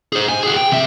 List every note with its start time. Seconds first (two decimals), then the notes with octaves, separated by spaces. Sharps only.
0.13 G#4 C5
0.29 G#5
0.43 F#4 G#4
0.57 G5
0.71 C3 E5